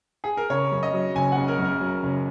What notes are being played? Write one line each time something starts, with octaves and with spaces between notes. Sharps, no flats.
G#4
A#4
C#3 C#5
F#2
D#5
F#3
F#1 G#5
F#5
C#3
A#4
F#2
A#4
F#3
F#1